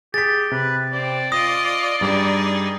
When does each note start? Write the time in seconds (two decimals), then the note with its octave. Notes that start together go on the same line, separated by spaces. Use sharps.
0.14 G4 G#4 A6 B6
0.52 C3 B4
0.93 C4 D5
1.32 F4 D#5 D#6 A#6
2.01 G2 G3 D#4 G#4